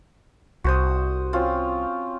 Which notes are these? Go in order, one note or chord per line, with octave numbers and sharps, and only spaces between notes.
C2 F#4 C5 D#6
C4 C#4 F4